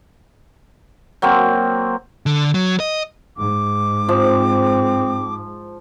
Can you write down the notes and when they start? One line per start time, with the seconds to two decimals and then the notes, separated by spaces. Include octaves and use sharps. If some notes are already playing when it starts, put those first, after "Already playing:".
1.22 F#3 A#3 C4
2.26 D3
2.54 F#3
2.80 D#5
3.37 G#2 D6
4.09 F3 C4